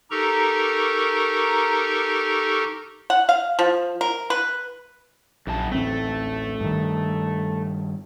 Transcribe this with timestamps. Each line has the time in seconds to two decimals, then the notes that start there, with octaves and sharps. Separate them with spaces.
0.11 D#4 G4 A4 A#4 A#5 C#6
3.10 F#5
3.29 F5
3.59 F3
4.01 A#4
4.30 B4
5.47 A#1 F#2 C#3 A5
5.72 A1 D2 A3 C4
6.60 G2 D#3